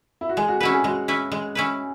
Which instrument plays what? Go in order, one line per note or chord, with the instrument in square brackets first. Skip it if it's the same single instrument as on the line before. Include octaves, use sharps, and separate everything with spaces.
[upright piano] E4
F#4
[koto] G#3 [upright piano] G#4
[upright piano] F#4
[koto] C#4 E4 B4 [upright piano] F#4
[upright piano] G#4
[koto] G#3 [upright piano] F#4
[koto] C#4 E4 B4
G#3
C#4 E4 B4